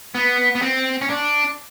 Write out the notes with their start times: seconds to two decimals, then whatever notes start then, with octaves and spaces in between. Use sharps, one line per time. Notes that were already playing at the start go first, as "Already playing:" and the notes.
0.15 B3
0.55 B3
0.62 C4
1.01 C#4
1.10 D4